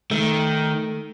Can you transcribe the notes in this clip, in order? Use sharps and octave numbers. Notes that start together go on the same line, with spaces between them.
D#3 A3